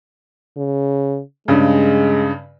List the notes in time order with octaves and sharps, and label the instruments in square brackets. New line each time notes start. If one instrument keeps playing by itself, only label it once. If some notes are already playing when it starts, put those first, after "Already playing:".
[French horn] C#3
[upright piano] G2 C#3 [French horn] G#3